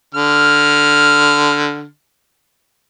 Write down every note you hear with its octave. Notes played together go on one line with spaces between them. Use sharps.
D3 F6